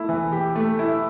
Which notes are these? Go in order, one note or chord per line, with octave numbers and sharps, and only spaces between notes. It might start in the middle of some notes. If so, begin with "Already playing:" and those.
Already playing: A3 E4
E3
G4
A3
E4